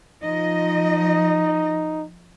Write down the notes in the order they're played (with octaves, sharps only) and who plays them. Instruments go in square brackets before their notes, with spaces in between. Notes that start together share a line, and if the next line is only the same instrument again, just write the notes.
[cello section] F3 D#5 [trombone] D#4